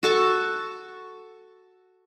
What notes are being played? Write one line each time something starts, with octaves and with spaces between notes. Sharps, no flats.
F#4 A4 A5 C#6